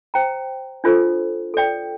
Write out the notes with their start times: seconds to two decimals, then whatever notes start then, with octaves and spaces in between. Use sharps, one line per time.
0.14 C5 G5 A#5
0.84 D4 F4 A4 C5
1.54 A4 D5 G5